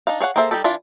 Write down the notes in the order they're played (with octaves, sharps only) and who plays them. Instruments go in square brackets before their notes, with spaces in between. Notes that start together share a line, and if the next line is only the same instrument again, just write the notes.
[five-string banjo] D4 D#4 F5
G#4 C#5 F5 F#5
A#3 G#4 A4 C5 E5
G3 D#4 G4 A4
E3 D4 E4 F4